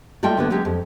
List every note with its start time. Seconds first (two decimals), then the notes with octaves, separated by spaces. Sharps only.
0.23 G3 A3 F4 D#5 G5
0.37 D2 D3 B3
0.50 F#3 G#3 C#4 G4
0.65 F2